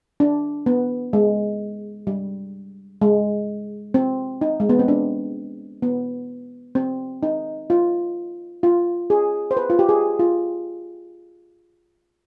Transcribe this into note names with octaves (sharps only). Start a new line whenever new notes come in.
D4
B3
G#3
G3
G#3
C4
D#4
G#3
B3
C4
D4
B3
C4
D#4
F4
F4
G#4
C5
B4
F4
G4
G#4
F4